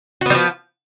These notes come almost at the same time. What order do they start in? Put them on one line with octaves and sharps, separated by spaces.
F#4 B3 G3 F3